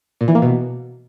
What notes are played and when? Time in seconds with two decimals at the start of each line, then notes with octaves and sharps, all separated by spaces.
0.21 A#2
0.28 E3
0.35 A#3
0.42 B2